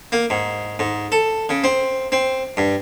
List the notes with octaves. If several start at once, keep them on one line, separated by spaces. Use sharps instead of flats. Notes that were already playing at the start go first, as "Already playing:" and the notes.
A#3
G#2
G#2
A4
C#3
C4
C4
G2